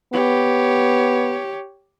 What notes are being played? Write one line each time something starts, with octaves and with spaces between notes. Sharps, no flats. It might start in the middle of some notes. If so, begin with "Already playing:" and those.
B3 G4 C#5